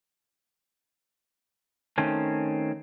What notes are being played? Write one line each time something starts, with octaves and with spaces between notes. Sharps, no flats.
D#3 A3 C4 C#4